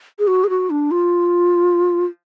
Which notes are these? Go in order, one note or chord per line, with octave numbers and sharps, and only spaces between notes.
G#4
F#4
G#4
F#4
D4
F4